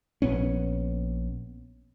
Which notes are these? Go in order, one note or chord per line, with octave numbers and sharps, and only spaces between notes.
A#1 B3 C#4